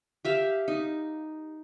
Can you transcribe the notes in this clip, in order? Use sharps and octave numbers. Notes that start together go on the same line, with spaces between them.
G4 E5 F5
D#4